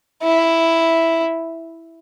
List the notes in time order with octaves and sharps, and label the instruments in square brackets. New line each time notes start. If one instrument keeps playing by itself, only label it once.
[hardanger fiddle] E4